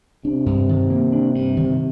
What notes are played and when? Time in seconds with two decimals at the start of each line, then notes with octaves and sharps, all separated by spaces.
0.25 C3 D4
0.46 G2
0.69 D#3
0.90 A#3
1.13 D4
1.35 G2
1.57 D#3